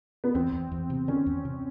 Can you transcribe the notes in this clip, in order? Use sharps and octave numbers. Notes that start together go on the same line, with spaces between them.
B3
E2 C4
E2
E2
C3
D#3 C#4
E2
C3